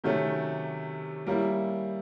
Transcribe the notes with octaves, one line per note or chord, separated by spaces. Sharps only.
C3 D#3 F#3 A3 C#4
G3 A#3 C#4 E4